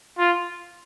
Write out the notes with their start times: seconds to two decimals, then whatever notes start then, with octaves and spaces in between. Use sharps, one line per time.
0.18 F4